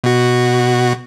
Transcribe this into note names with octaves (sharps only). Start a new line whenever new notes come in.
B2 F#4